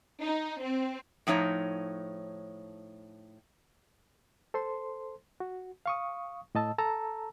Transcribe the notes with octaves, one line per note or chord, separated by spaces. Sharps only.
D#4
C4
A2 F3 D#4 C#5
A4 C5 C6
F#4
F5 C#6 D#6
A2 D#5 A5 E6
A4 A5 A#5 E6